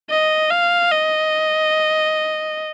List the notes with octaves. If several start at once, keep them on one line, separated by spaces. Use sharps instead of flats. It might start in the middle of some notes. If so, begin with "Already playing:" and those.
D#5
F5
D#5